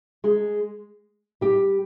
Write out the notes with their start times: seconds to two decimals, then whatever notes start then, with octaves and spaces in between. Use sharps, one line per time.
0.24 G#3 G#4
1.41 G3 G4